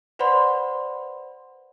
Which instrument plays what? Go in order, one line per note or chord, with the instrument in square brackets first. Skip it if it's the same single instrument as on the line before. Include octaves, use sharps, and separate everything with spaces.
[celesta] B4 C5 D5 F#5 B5 C6